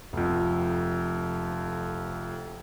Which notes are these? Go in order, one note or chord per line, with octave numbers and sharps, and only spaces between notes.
F1 F2